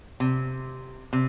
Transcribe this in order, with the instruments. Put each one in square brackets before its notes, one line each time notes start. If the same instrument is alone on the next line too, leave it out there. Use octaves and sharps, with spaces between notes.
[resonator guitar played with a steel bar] C3
C3